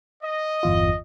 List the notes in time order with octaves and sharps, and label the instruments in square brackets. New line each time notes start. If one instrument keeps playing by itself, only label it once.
[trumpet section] D#5
[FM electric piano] G1 E2 F4